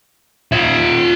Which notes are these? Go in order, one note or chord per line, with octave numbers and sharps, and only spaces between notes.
F4 E5